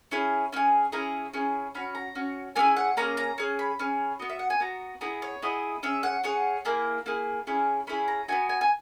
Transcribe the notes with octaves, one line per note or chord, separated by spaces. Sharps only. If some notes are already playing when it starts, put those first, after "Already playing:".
C#4 E4 G#4
C#4 E4 G#4
C#4 E4 G#4 A#5
C#4 E4 G#4
C#4 F#4 B5
A#5
C#4 F#4
A#3 C#4 E4 G#4 G#5
F#5
A#3 C#4 G#4 A#5
A#5
C#4 G#4
B5
C#4 G#4
B3 F#4 D#5
E5
F#5
G#5
B3 F#4 A#5
B3 E4 G#4 A#5
C#5
B3 E4 G#4 D#5
C#4 G#4 E5
F#5
C#4 G#4 F#5
A#3 E4 G#4 A#5
A#3 E4 G#4
C#4 E4 G#4
C#4 E4 G#4 B5
A#5
B3 D#4 F#4 G#5
G#5
G#5